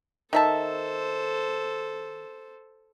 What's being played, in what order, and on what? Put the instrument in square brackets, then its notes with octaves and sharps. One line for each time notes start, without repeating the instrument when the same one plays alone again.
[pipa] D#3 E5 A5 [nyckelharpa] A4 C5